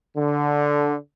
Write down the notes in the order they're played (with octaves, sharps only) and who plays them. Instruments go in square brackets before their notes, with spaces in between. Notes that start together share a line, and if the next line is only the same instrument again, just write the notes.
[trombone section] D3